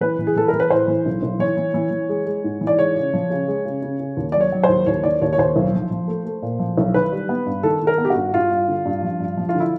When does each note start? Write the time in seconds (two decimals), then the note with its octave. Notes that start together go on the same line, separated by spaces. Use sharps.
0.01 E3 B4
0.19 E3
0.27 G#4
0.36 E3 A4
0.48 E3 A#4
0.60 B4
0.70 A2 C5
0.88 E3
1.06 B1
1.23 B1
1.39 E3 C#5
1.57 E3
1.74 E3
1.91 E3
2.09 G#3
2.26 G#3
2.44 G#2
2.61 E3
2.67 D5
2.78 G#3 C#5
2.96 C#3
3.13 F3
3.30 C#3
3.48 G#3
3.65 C#3
3.82 C#3
4.00 C#3
4.17 D#2
4.32 F#3 D5
4.41 C#5
4.52 F#3
4.64 C5
4.69 D#2
4.86 D#2 C#5
5.03 D#3 D5
5.22 D#2 C#5
5.33 C#5
5.38 D#2 C5
5.56 B1
5.73 F3
5.91 F3
6.08 A3
6.25 A3
6.42 A#2
6.59 F3
6.78 B1
6.94 D#3 B4
7.12 G3
7.29 B3
7.46 G2
7.63 D#3 A4
7.81 D#3
7.87 A#4
7.98 B3
8.05 G4
8.10 F#4
8.15 G2
8.33 G2 F4
8.51 G2
8.68 D3
8.85 G2
9.03 F3
9.20 G2
9.37 F3
9.49 F4
9.55 D3
9.60 E4